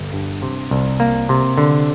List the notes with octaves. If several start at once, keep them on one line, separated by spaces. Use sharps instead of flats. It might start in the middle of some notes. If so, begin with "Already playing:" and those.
Already playing: G1
G2
C3
C2
A#3
C3
D3